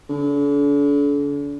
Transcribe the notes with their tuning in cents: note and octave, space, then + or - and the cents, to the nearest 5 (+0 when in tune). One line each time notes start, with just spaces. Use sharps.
D3 -40